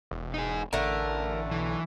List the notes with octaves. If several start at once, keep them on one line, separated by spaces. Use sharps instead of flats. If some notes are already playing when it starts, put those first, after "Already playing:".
E1
D#4 G#4
A1 D3 A3 A#4
B1 E3